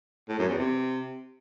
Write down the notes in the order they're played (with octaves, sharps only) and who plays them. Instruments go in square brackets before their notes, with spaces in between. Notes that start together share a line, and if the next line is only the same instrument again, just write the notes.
[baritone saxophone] A2
F#2
E2
C3